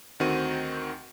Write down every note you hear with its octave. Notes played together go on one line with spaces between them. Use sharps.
D2 D#3 C4 F#4 D#7